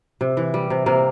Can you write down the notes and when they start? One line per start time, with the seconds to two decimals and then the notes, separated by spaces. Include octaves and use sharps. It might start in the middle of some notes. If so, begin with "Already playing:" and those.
0.21 C3
0.37 E3
0.54 G3
0.70 C3
0.86 C3 A#3